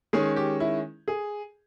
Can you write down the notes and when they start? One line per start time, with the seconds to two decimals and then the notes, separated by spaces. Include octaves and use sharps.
0.13 D#3 G#3 C#4 G#4
0.36 G4
0.60 E4
1.08 G#4